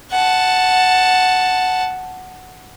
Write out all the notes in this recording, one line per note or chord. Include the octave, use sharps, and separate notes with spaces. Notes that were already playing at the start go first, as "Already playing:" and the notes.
F#5 A5